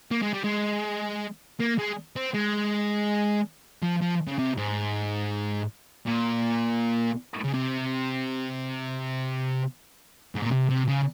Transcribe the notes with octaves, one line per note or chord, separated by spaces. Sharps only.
A#3
G#3
G3
G#3
A#3
G#3
C4
G#3
F3
F3
C#3
C3
G#2
A#2
C#3
C3
G#2
A#2
C3
C3
C#3